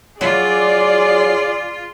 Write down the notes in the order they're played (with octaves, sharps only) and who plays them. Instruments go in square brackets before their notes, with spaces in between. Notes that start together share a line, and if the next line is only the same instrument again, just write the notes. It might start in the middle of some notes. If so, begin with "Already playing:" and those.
[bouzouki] F#3 [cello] F4 [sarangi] G#4 [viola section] D5